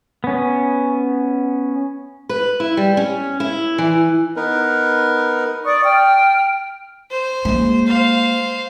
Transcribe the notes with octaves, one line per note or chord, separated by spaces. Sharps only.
B3 C#4
B4
E4
G3
C#4
E4
E3
B3 D#4 A#4 B4
D5 C#6 D#6
G5 F6
C5
G#3 A#3
C5 F5